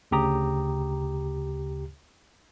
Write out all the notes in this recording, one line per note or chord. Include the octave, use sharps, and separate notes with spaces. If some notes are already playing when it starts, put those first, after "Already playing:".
D2 C#3 G4 A#5 D#6